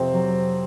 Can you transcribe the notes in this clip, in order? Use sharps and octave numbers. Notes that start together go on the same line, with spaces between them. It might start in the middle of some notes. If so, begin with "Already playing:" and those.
Already playing: F2 C3 C4
F#3